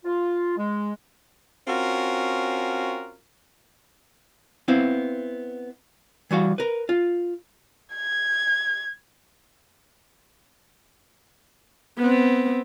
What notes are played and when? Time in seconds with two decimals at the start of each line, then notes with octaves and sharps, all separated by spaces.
0.05 F4
0.57 G#3
1.68 C4 C#4 F4 F#4 A#4
4.68 B3 C4 E4 F5
6.31 E3 G3 F#4 F5
6.58 A#4 B4
6.89 F4
7.94 G#6
11.98 B3 C4